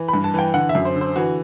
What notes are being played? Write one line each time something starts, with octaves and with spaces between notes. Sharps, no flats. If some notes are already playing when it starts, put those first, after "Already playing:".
Already playing: E3
B5
G2
A5
E3 G5
D3 F#5
E5
F#2
C5
D3
C5
E3 F#4